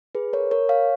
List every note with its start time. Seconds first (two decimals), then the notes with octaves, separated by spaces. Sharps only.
0.15 G#4 B4
0.33 A#4 C#5
0.51 A#4 C#5
0.69 C#5 F5